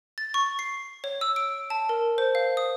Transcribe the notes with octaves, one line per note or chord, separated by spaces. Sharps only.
A6
C#6
C7
C#5
E6
D7
A5
A#4
C5
F5
D#6